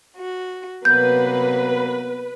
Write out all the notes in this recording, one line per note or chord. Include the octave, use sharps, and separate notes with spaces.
F#4
C3 F#3 A#3 B3 B4 G6